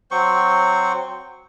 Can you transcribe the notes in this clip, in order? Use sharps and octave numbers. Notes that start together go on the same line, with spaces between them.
F#3 C4 C5 C#6